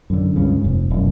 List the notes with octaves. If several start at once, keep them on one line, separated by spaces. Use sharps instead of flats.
F#2 D3
C#2 G2 C#3
F1
E1 F#2